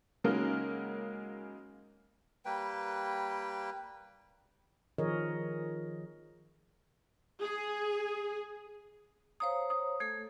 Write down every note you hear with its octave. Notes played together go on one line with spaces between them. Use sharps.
C#3 F#3 G#3 A#3 D#4 A#4
G3 A#3 B4 G5
D#3 F3 G#4 A#4 C#5 D#5
G#4
C5 C#5 F5 A#5 D#6
D#6
A3 A4 G#6